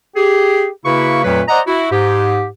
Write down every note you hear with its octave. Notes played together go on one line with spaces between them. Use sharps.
G4 G#4
C#3 A#3 E4 F#4 B4 C#6
F2 A#2 F#3 A3 B4
C5 D5 D#5 F#5 A#5
E4 F#4
G#2 G4